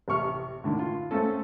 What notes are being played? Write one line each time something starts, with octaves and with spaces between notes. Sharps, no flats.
A1 C3 C#6 F6
A2 D3 D#3
F4
A3 C4 C#4 A4